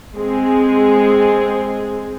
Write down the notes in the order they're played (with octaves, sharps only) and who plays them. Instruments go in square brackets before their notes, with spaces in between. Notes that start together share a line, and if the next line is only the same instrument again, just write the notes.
[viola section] G#3 C4 G#4